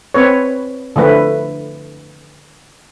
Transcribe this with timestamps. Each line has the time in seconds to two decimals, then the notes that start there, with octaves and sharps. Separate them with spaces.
0.14 C4 B4 C#5
0.96 D3 F3 A3 B4